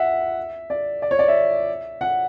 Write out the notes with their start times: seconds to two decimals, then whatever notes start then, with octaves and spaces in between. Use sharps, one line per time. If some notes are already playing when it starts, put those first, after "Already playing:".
Already playing: E5 F#5
0.70 D5
1.02 D5
1.11 C#5
1.19 D5
1.28 E5
2.01 F#5